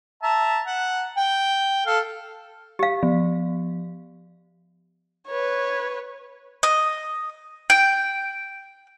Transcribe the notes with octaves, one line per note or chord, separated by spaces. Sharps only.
E5 A5 A#5
F#5
G5
A4 F5
G4 F5
F3
B4 C#5
D#5
G5